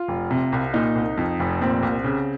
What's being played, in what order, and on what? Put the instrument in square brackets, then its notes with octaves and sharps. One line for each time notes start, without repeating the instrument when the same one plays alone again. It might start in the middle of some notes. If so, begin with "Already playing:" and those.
Already playing: [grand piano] F4
F1
C3
C2
A#2 D#4
C2
F2
F1
A#2 C4
C2
C#3